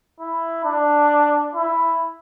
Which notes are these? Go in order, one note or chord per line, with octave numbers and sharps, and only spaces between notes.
E4
D4
E4